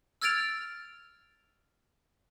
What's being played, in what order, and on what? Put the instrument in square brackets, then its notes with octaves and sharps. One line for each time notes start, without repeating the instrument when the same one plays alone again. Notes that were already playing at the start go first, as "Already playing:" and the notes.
[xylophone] E6 F6 G#6 A6 D7 F7